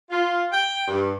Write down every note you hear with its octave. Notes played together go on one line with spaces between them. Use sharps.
F4
G5
G2